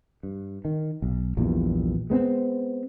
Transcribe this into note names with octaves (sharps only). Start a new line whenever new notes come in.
G2
D#3
B1
A#1 E2 G2 A#2
G#3 B3 C4